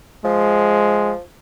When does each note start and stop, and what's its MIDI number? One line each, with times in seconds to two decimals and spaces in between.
0.25 1.20 53
0.25 1.13 56